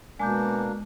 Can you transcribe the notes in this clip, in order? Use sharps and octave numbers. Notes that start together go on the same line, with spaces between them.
B2 G#3 A#3 D4 G#5 D6 G6